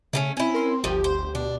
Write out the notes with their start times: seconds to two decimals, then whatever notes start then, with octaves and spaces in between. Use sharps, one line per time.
0.13 C#3 A3 A#3 C#4
0.37 C4 C#4 E4
0.54 A#4 C6
0.84 G1 D2 F3 G4
1.04 C5
1.35 B2 D4